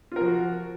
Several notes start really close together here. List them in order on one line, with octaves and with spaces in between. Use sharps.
F4 A#4 F3 F#4